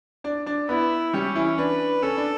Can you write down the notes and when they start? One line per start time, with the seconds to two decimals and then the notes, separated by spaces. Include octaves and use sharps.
0.24 D4 D5
0.46 D4 D5
0.69 B3 E4 B4
1.13 G3 C#4 G4
1.35 E3 E4
1.58 D4 B4
2.03 C#4 A4
2.17 D4